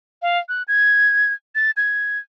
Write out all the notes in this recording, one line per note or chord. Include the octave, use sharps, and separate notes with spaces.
F5
F#6
G#6
A6
G#6